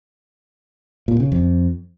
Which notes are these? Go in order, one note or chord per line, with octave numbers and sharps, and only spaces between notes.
A#2
C#3
F2